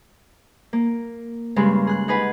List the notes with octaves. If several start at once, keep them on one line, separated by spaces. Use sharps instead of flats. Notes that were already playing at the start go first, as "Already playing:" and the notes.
A#3
G2 C#3 G#3
G#4 F#6
D#4 G#4 B4 F#5